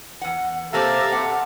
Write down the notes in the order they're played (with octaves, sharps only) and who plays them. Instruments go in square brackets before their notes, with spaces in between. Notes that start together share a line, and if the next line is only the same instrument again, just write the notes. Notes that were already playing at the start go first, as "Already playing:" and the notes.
[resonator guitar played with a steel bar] E2 F#5
[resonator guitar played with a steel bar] C3 A#3 C4 [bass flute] G4 [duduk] A4 [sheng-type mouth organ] E5 F5 A#5
[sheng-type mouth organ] C4 [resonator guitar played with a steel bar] F#5